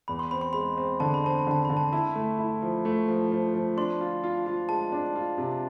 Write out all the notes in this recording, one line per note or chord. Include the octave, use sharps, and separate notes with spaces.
E2 B5
C6
C4 B5
C6
G#3 B5
C4
D3 A5
B5
C4 A5
B5
D3 A5
D3 B5
A5
E4 A5
A3
E4
F3
A3
F3
F3
F3
D4 C6
F4
F4
F4
G#3 A5
D4
F4
C3